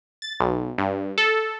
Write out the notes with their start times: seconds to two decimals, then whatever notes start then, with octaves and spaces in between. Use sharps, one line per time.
0.22 A6
0.40 B1
0.78 G2
1.18 A4